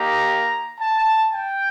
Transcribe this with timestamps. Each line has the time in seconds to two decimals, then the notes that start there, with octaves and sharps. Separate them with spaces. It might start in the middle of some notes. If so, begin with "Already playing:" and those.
Already playing: A#3 D#4 G4 A#5
0.79 A5
1.33 G5